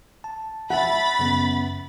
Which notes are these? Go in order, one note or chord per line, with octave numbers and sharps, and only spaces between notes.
A5
E5 F#5 B5 A6
F#2 C#3 B3